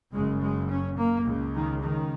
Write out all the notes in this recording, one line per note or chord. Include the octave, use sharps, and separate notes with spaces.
F#1 F#2 C#3 G#3
G#3
C#4
A#3
C#2 C#3
D#3
D#3